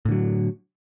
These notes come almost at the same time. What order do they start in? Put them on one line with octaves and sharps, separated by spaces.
A2 D3 F#3